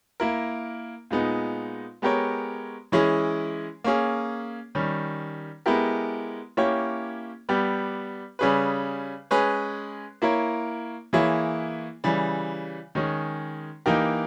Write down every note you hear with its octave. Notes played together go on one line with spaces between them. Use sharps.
A#3 E4 A#4
A#2 G#3 B3 D#4
G#3 B3 G4 A#4 C#5
E3 G#3 C#4 E4 G#4
A#3 C#4 G#4
D#3 G3 C#4
G#3 B3 E4 G4 A#4
A#3 C#4 E4 G4 C#5
G3 B3 G4
C#3 G3 C#4 G#4 B4
G#3 C#4 G#4 B4
A#3 E4 A#4 C#5
E3 A#3 E4 G#4 C#5
C#3 E3 G3
D#3 G#3 C#4 G#4
E3 A#3 D#4 G4 A#4